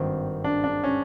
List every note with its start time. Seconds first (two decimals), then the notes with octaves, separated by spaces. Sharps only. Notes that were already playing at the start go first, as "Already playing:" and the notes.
Already playing: G#1 G2 D#3 C4
0.44 D4
0.64 D4
0.84 C#4